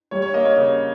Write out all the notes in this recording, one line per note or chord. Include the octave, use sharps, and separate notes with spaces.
G3 C#5
C#5
A#3 D#5
C#5
C#3